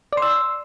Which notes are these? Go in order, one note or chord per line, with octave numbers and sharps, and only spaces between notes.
D5 C6 E6